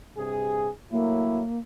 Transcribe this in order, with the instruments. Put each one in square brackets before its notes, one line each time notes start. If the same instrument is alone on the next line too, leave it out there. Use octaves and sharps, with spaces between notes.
[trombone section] G2 C3 G#4
[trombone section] A2 F#3 E4 [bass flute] A#3